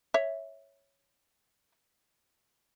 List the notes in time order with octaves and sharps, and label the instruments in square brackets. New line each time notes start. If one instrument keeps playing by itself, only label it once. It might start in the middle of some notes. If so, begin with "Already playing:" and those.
[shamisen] C#5 E5